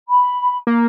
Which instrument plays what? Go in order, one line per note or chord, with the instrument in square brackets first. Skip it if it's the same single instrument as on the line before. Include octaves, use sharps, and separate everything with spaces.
[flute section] B5
[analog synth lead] A#3